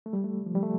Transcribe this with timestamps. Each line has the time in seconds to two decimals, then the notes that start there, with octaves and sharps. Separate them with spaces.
0.06 A3
0.13 G3
0.24 A3
0.46 F3
0.55 G3
0.63 A3